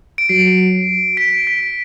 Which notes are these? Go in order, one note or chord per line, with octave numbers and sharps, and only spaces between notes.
D7
F#3 C7
B6 D7
B6